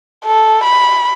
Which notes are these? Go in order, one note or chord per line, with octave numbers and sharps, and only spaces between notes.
A4
B5